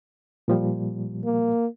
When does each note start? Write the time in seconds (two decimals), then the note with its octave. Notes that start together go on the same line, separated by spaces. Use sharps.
0.48 A#2 F3 G3
1.25 A#3